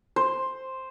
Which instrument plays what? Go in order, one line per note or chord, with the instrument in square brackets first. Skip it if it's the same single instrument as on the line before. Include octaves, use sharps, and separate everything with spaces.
[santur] C5